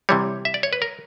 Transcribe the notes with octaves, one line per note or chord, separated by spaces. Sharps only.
C3 E3 G3 C#5
E5
D5
C#5
B4
A#4